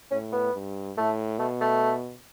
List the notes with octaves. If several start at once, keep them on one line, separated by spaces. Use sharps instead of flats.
A2 C#4
B3
G2
A2 A3
B2 A3
A3